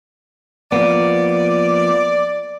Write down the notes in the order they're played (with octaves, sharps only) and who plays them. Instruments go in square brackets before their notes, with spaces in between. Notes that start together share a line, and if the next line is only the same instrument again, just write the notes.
[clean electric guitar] F3 A#3 B3 [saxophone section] D5